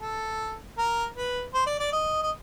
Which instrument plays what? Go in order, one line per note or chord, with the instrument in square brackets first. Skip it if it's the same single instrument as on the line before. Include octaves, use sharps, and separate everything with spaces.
[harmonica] A4
A#4
B4
C5
D5
D5
D#5
D#5